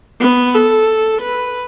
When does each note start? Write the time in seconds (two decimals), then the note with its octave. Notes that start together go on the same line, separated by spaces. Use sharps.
0.21 B3
0.54 A4
1.21 B4